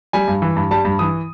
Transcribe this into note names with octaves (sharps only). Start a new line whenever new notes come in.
G3 G#5
G2
E3
G2
G3 A5
G2
E3 D#6